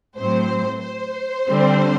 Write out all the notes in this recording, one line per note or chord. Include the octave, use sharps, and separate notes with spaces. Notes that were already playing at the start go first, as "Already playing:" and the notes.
A2 F#3 C4 C5
C5
D3 G3 C4